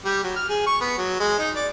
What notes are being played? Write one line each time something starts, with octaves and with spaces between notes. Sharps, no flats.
G3
F#3
F6
G#4
C#6
B3
F#3
G#3
D#4
D5